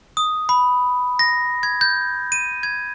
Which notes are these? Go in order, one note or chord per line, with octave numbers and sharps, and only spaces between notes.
D#6
B5
A#6
G#6
G6
D#7
G#6